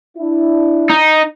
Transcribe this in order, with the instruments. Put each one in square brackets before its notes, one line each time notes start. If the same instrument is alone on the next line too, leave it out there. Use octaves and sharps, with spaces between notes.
[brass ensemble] D4 E4
[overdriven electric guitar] D#4